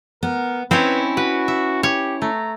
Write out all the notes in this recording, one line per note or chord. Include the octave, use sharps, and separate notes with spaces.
B3 A#4
C4 C#4 D#4 E4 B4 C#5
F#4 B4
E5
G4 C#5
A3 A#5